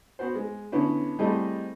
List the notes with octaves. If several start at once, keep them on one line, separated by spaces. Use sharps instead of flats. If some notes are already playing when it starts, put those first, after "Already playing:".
B3 F#4 C5
G#3
D3 B3 C#4 E4
G3 A3 C4 E4 G#4 D#5